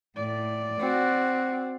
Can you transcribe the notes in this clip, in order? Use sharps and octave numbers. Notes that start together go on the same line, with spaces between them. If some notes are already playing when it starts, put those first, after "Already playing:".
A2 D5
C4 F#4